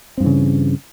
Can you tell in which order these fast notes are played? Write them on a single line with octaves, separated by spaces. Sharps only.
C4 G2 E3 C#3